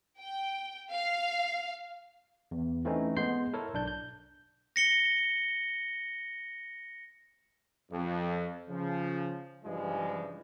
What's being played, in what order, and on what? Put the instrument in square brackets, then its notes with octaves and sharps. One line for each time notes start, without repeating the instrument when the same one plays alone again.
[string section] G5
F5
[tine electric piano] E2
E3 A3 C4 C#4 D#4
G#3 B3 C6 G6 C7
E4 A4 A#4 C#5
B1 D4 G6
G6
[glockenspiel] A#6 C#7 G7
[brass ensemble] F2
C#3 F3
G2 C#3 E3 F3 G3 G#3